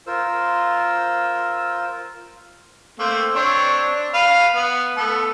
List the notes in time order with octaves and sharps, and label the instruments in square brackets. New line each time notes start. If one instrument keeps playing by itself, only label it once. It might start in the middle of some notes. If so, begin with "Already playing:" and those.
[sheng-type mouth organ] F4 A#4 C5 E6
[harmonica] A3 A#3 C4
C4 D4 C#5
D4
B4 F5
B3
A3 B3 A4